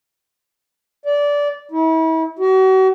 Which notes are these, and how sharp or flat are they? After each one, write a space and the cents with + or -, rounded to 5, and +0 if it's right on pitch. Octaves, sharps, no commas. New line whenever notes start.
D5 -20
E4 -40
F#4 +40